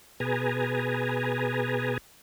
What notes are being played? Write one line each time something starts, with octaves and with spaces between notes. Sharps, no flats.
B2 G#4 B4 G#5 A#5